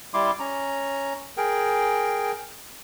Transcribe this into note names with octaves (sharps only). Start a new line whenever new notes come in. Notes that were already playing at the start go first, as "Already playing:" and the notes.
G3 E4 C6 D6
C#4 A#5
G#4 A#4 G5